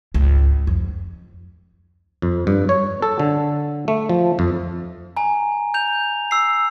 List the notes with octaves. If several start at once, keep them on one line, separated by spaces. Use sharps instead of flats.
C#2 G#2
F2
F2
G2
C#5
A4
D3
A3
F3
F2
G#5 A#5
G6 F7
E6 C7